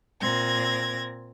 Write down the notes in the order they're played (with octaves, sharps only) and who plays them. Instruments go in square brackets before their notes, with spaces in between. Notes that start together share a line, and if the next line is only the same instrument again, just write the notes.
[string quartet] A#2 C4 G#6 A#6